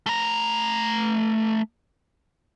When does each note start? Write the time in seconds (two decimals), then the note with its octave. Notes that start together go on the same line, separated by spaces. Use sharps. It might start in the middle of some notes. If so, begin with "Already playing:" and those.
0.06 A3 A#5